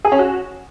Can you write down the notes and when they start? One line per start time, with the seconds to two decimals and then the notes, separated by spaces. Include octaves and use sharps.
0.05 G#4
0.12 C#4
0.19 F#4